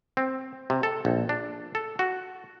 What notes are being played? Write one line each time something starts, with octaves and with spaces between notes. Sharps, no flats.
C4
C3
A4
A#1
D4
A4
F#4